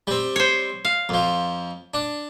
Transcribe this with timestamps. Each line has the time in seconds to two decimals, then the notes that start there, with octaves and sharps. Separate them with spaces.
0.07 G3 C4
0.36 C5 C#5
0.85 F5
1.09 F2 F3
1.94 D4